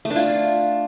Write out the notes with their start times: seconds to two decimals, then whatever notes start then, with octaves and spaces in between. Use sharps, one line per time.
0.05 A3
0.10 D4
0.16 F4